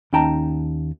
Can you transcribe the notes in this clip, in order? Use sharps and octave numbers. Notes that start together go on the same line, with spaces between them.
D#2 C#4 D#4 G5 A5 A#5